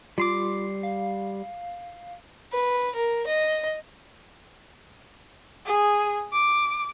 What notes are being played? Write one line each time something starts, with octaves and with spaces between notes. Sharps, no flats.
G3 F4 C6 D6
F5
B4
A#4
D#5
G#4
D6